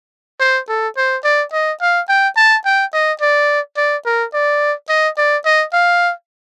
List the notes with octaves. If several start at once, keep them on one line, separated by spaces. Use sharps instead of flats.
C5
A4
C5
D5
D#5
F5
G5
A5
G5
D#5
D5
D5
A#4
D5
D#5
D5
D#5
F5